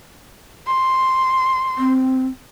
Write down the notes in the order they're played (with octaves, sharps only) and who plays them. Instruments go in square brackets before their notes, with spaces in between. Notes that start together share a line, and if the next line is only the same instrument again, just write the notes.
[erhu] C6
[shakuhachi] C4